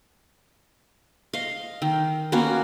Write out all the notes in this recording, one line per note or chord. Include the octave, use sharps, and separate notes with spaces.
D#5 F5
D#3
A#3 B3 C#4 F#4